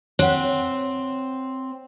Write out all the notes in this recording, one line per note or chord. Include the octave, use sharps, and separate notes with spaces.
C4 C#5 F#5